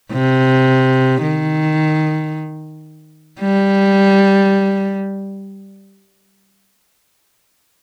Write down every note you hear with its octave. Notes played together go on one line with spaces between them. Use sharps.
C3
D#3
G3